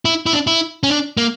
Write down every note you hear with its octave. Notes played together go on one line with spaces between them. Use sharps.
E4
E4
D4
E4
C#4
D4
A#3